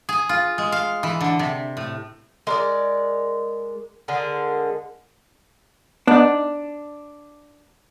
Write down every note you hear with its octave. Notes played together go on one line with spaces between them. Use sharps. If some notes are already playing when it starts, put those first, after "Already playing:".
G#4
F4
G#3
F5
E3
D3
C3
A2
G#3 A#4 D5
D3 G#3 G#4 A#4
B3 D4 D#4